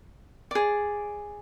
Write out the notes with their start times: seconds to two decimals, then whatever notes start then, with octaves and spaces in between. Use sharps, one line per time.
0.51 G#4 D5